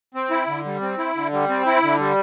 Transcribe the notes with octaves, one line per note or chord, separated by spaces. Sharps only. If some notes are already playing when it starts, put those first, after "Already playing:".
C4
E4
D3
G3
C4
E4
D3
G3
C4
E4
D3
G3